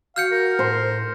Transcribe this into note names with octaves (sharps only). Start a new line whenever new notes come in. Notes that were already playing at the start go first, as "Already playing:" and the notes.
F#4 F5 F6 G6 C#7
A#4
A2 C5